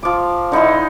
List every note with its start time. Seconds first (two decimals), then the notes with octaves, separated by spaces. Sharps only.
0.03 F3 D6
0.52 D3 D#4 E4 C6